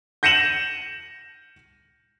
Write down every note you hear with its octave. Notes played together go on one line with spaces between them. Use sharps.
G6 A#6 C#7 D#7 E7 F#7